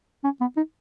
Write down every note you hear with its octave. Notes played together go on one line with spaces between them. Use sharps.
C#4
B3
D#4